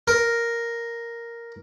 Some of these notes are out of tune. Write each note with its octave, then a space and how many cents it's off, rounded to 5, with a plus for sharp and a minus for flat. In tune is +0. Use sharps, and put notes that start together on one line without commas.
A#4 +0